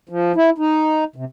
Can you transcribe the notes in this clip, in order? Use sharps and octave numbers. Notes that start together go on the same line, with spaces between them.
F3
E4
D#4
C3